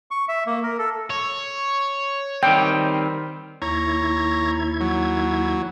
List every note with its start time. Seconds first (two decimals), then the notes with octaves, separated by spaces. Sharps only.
0.11 C#6
0.29 E5
0.47 A#3
0.63 A#4
0.78 A4
1.10 C#5
2.43 D#3 G3 C4 G5
3.62 D#2 E4 C#5 A#5 G#6
4.81 F#3